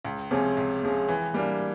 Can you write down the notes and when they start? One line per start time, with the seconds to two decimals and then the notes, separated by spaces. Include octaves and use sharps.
0.05 C#2
0.31 C3 F3 G#3 C#4
0.57 C#2
0.82 C3 F3 G#3 C#4
1.08 E3
1.34 G3 A#3 D4